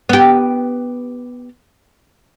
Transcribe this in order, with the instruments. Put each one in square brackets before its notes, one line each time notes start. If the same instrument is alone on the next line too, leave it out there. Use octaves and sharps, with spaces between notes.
[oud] B3 G4